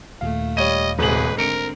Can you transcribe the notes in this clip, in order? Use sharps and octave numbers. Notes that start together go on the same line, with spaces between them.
D#2 A#2 A3 F5
G3 C#5 D#5 D#7
D#1 G#2 C3 G#4 B4 F#7
D3 C4 A#4 C#7 D7